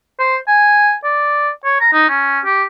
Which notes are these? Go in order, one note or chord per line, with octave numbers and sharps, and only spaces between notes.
C5
G#5
D5
C#5
A#5
D#4
C#4
G4